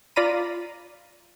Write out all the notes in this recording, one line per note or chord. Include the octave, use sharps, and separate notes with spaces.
F4 D5 F5 A#5 B5 D#7